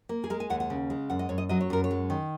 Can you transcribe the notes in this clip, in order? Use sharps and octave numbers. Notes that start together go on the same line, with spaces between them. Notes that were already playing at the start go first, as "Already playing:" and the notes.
A#3
G#4
G#3 A#4
G#5
D#2 F#5
F#5
C#3
G#3
F#2 F#5
D#5
F#2 C#5
D#5
F#3 D#5
C#5
F#2 A#4
C#5
G#3
D#3